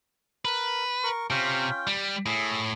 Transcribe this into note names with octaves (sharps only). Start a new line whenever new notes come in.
A#4 B4
A#4 C#6
C3 C#4 F4 G5
G3
A2 G#4 E5